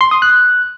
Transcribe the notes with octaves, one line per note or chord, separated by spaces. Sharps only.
C6
D#6
F#6